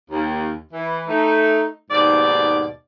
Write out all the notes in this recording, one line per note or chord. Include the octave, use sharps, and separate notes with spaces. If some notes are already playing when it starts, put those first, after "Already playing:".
D#2
E3
A3 D#4
D#2 G#2 B2 D5